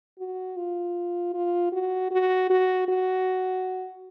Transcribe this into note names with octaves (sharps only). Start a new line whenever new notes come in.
F#4
F4
F4
F#4
F#4
F#4
F#4